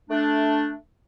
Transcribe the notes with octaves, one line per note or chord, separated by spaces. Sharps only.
A3 D4